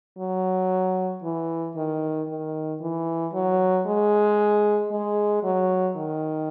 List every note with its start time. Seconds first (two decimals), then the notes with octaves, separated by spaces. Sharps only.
0.18 F#3
1.23 E3
1.76 D#3
2.28 D#3
2.80 E3
3.33 F#3
3.87 G#3
4.91 G#3
5.43 F#3
5.96 D#3